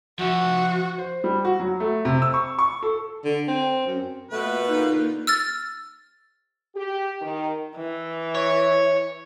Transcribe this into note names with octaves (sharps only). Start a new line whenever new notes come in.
F3 F#4 E5
C5
G3
F#4
F#3
A3
C3
E6
C#6
C#6
A4
D3
C4
F#2
B2 A3 A#3 F4 B4
A#2 D3 D#4
E6 F6 A6
G4
D#3
E3
C#5